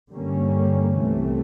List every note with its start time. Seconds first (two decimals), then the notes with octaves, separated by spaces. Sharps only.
0.10 G2 D3 G3 A#3 C#4
0.97 C2 C3 E3 A3